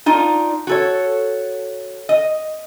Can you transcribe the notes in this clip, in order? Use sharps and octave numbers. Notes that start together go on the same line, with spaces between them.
D4 D#4 F4
F#4 A4 C#5
D#5